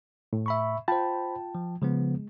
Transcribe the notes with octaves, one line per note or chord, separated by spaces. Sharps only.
A2
E5 B5 C#6
F4 C5 G5 A5 B5
F3
C#3 F3 G#3 B3